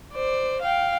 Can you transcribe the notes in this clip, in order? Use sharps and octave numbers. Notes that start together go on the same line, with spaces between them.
C5 D5
F5 G5